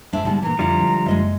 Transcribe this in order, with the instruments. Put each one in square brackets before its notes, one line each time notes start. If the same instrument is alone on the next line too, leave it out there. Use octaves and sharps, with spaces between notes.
[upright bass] F2 G#3 [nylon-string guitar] G#2 D4 F5 [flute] E5
[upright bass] G#2 B3 [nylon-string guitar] D3 G3 G#3 [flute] A5
[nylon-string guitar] A#2 E3 [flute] A#5
[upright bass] F2 [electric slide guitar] D3 F3 G3 [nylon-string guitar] E4 G4
[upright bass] G#2 G#3
[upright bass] F#1 [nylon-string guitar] G#3 D#5 E5